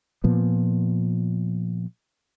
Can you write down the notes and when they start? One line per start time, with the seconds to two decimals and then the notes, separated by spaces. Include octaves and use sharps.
0.24 A#2 F3 B3